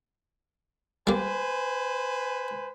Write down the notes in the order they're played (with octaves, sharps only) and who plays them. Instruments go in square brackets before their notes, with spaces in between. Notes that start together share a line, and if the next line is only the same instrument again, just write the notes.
[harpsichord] G3 A#3 [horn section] B4 C5 G#5